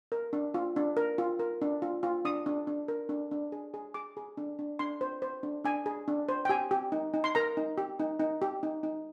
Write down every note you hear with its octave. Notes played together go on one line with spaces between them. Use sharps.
A#4
D4
F4
D4
A#4
F4
A#4
D4
F4
F4
D4 D#6
D4
D4
A#4
D4
D4
G#4
G#4
G#4 D6
G#4
D4
D4
D4 C6
C5
C5
D4
D4 G#5
G#4
D4
C5
G5
G4 G#5
G4
D#4
D#4
C6
A#4 A#5
D#4
G4
D#4
D#4
G4
D#4
D#4